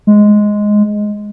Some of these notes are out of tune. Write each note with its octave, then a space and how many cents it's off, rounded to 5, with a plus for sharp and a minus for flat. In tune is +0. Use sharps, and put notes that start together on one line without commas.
G#3 +5